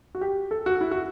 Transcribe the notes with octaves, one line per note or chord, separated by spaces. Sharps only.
F#4
G4
A4
F#4
E4
F#4